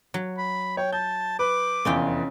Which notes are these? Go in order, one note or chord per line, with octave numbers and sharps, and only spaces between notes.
F#3
B5
C#5 G5
A5 G6
B4 D6
F1 E2 C#4 F4 G5